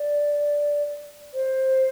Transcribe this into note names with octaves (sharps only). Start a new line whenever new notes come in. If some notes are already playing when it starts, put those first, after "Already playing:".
Already playing: D5
C5